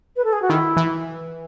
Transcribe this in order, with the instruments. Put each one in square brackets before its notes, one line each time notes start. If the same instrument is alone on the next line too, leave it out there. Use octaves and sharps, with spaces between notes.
[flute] B4
A4
G#4
F#4
[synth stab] D#3 [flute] E4
[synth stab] E3